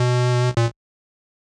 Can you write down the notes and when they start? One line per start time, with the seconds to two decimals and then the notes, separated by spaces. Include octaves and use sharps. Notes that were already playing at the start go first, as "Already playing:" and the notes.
Already playing: B2
0.57 A#2